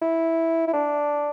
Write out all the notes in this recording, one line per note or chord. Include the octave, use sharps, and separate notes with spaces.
E4
E4
D4